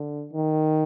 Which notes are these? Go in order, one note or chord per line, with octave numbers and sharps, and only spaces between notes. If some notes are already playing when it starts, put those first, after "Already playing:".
Already playing: D3
D#3